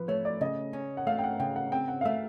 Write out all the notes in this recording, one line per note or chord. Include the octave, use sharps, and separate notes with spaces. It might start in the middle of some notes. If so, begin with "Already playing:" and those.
Already playing: F3 B4
A3 C#5
D5
C#3 D#5
C#4
F#5
A3 F5
G5
F#5
C#3 G5
F#5
C4 G5
F#5
F5
A3 E5